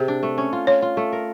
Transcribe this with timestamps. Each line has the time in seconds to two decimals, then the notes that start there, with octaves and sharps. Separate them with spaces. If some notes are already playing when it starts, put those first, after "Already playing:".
Already playing: C3 G#4
0.08 D4
0.23 A3
0.38 C#4
0.53 F4
0.67 F4 C#5
0.82 F4
0.97 A3
1.13 A#4